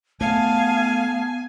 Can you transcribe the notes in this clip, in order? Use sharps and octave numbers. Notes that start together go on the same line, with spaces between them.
A3 B3 F5 G#5 A5